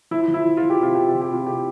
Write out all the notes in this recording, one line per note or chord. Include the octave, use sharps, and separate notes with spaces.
F3 E4
F3
E4
F3
F4
F3
G4
C3 F4
C3 G4
F4
F3
G4
C3 F4
C3 G4